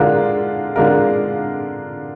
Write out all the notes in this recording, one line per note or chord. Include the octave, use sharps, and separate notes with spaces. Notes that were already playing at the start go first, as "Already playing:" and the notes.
Already playing: D3 G#3 D4 F4 A#4
D3 G#3 D4 F4 A#4